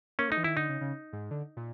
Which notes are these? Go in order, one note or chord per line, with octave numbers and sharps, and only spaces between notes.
A#3 C#4
A3 D#4
E3
D#3 E4
D3 D#4
C#3
C#3
G#2
D3
A#2